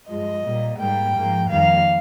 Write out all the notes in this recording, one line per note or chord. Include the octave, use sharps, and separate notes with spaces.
G2 F3 G#3 D#5
A#2 G3 A#3
G#2 G3 A#3 G5
G#2 F3 A#3
F2 D#3 G3 A#3 F5